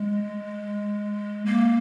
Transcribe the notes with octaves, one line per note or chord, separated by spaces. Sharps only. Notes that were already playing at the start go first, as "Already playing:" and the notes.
Already playing: G#3
A#3